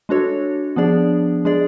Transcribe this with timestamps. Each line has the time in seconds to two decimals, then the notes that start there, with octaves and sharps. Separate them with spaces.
0.09 G#3 D4 F#4 A4 C#5
0.76 F3 B3 D4 G#4 D5
1.45 G#3 D4 G#4 D5